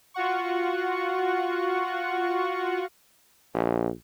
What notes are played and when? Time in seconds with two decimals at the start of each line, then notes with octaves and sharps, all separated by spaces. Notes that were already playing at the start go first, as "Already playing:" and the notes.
0.14 F4 F#4 F#5 C#6
3.54 A#1